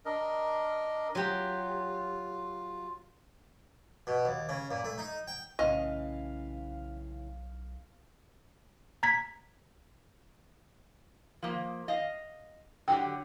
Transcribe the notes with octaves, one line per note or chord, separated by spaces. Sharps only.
D4 A#4 D#5
F#3 F4 G4
B2
D#2
C#3
A#2
A3
D#4
G5
B1 A2 C#3 E3 D#5 F5
A#5 G#6 B6
F3 A#3
D#5 F5
D3 F#3 G4 G5